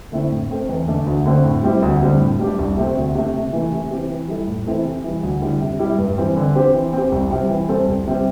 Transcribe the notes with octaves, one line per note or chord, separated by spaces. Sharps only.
D3 A3 C4 E4
A2
A3 C4 A4
E2
D3 A3 D4
D2
D3 A3 C4 A4
A2
G3 C4 E4 G4
D2
D3 G3 C4
A2
G3 D4 G4
C2
C3 A3 C4
D2
C3 A3
C3
E3 A3
C3
E3 C4 G4
E3
G3 E4 A4
A2
E3 C4 E4 A4
C3
E3 G3
D2
D3 G3 E4 G4
C3
G3 E4 G4
G2
E3 G3 C4 E4
D3
C4 G4 C5
E3
C4 G4
C2
C3 G3 C4
E3
G3 C4 A4 C5
C2
C3 G3 C4